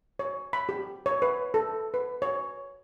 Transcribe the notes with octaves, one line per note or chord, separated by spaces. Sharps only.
C#5
B5
G4
C#5
B4
A4
B4
C#5